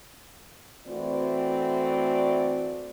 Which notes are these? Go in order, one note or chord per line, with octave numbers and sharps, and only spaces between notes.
E3 A3 C4 F#4 D5